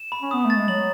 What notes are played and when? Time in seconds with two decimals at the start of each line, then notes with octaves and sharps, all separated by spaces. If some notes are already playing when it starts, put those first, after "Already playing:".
Already playing: E7
0.12 B5
0.22 C#4
0.31 B3 D#6
0.45 A3 A6
0.57 G#3
0.68 F#3 F#7